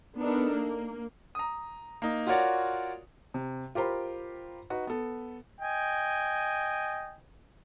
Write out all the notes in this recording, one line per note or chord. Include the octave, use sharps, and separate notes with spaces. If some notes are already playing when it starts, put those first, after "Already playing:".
B3 D4 D#4 A4 A#4
A#3
A#5 D#6
A#3 D#4
F4 F#4 A#4 C#5 D5 F#5
C3
F4 G4 A#4 C5 A#5 B5
D#4 F#4 B4
B3 A4
D#5 G5 G#5